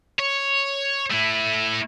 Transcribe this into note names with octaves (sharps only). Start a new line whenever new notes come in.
C#5
A3 E4